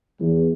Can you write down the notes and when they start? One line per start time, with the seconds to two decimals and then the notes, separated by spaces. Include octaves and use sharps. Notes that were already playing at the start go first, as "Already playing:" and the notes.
0.20 E2